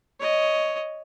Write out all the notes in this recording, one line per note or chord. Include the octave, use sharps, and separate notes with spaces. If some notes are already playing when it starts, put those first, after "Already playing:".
C#5 D#5